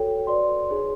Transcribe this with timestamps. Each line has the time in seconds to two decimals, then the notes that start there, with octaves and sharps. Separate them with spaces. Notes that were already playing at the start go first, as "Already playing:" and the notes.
Already playing: F#4 A4 C#5 G5
0.27 F#4 B4 D5 C6
0.69 D#4 G#4 C#5